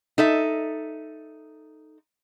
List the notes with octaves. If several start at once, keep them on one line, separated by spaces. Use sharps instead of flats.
D#4 A4 E5